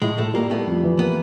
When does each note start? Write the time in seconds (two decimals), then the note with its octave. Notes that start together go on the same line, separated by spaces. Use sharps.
0.02 A2 G#3
0.18 A2 A3
0.34 G3 A#3
0.51 A3 B3
0.67 F2
0.83 E3
0.99 A#3 B3